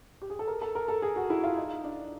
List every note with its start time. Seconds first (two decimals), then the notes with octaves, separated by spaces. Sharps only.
0.22 G4
0.30 G#4
0.39 A4
0.47 A#4
0.62 A4
0.75 A#4
0.88 A4
1.02 G#4
1.16 F#4
1.30 E4
1.44 F4
1.57 D#4
1.84 D4